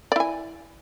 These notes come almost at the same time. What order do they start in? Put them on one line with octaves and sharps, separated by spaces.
D5 E4 G#5